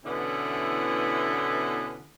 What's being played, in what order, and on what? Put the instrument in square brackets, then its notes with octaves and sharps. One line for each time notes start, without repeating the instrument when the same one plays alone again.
[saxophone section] B2 D3 E3 B3 C#4 E4